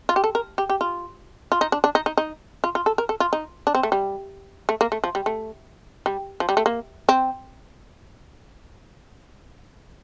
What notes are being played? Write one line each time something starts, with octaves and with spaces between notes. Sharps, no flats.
F4
G4
A4
A#4
G4
G4
F4
F4
D#4
D4
D4
D#4
D#4
D#4
F4
F4
A4
A#4
A4
F4
D#4
D4
C4
A3
G3
A3
A#3
A3
F3
G3
A3
G3
F3
G3
A3
A#3
C4